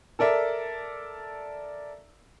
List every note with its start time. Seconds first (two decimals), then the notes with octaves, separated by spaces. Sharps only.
0.19 A4 A#4 D5 E5